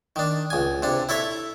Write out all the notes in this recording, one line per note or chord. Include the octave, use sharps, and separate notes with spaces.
D#3 D4
C#2 G#5
C3 D4
E4 A4 C#5 E5